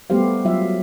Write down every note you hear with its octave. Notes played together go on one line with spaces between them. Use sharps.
G3 A3 B3 G4 C5 F5
F#3 F4 E5 F5